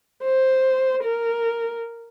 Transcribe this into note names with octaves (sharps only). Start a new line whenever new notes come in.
C5
A#4